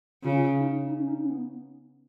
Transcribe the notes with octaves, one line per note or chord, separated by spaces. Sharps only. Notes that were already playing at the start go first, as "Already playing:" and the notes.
C#3 F4
D#4
D#4
C#4
D#4
C#4
B3